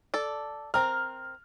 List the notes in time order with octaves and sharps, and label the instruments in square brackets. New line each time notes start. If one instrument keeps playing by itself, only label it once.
[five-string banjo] A4 D5
[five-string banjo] C4 A#4 [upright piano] F6